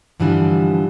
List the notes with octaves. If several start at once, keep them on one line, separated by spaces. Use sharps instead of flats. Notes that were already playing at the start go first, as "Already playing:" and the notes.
G2 D3 E3 F3 G3 D4